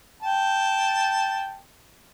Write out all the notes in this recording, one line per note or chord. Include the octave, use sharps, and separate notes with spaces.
G5 A5